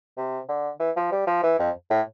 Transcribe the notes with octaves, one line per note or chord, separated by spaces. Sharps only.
C3
D3
E3
F3
G3
F3
E3
F2
A2